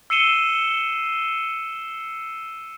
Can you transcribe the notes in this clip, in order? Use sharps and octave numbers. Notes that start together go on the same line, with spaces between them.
E6 C7 C#7 D#7 E7 G7